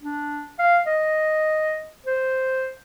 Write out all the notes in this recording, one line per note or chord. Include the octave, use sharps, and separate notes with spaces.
D4
F5
D#5
C5